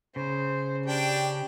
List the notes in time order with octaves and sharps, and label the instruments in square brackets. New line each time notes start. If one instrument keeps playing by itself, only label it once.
[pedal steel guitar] C#3 [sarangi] C5
[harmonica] D4 G5 [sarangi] G4